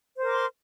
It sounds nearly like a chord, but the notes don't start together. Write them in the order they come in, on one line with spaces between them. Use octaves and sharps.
C5 A#4 D6 C6